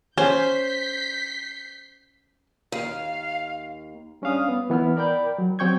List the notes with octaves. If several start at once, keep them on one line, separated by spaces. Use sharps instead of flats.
C#4 C5 G6 B6 C7
D#2 F5
G3 C#4 D4 F5 D#6
B3
E3 B3 E4 F6
A#4 D5 G5 B5 G6
F#3
F#3 C4 G5 C#6 G6 G#6